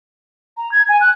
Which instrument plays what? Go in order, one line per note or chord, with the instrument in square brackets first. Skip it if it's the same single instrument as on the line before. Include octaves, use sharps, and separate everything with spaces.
[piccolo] A#5
G#6
G#5
F#6